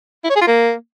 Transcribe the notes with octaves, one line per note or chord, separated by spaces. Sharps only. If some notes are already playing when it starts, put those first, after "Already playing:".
E4
C#5
G#4
F4
A#3